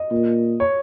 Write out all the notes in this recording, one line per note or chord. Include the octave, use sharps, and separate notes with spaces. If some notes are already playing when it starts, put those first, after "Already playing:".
Already playing: D#5
A#2
C#5